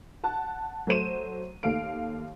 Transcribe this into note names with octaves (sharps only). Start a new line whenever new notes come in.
F#5 A5 F#6
F#3 A3 C5 D#7 E7
D#2 A3 F5 D7